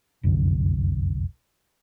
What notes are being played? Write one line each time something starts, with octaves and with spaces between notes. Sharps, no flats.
F1 C2 F#2 D3